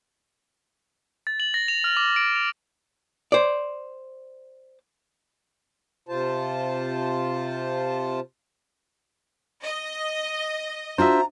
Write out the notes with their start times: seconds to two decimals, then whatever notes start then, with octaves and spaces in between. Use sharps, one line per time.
1.27 A6
1.40 F#7
1.54 A#6
1.68 F7
1.84 F6
1.97 D6
2.16 D7
2.36 F7
3.32 C5 D5
6.09 C3 F4 C5 A5
9.64 D#5
10.98 D4 F4 F#4 C5 E5 A#5